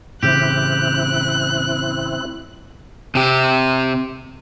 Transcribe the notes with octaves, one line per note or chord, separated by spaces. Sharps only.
A2 C#3 E3 C4 E4 G4 F#6
C3 G4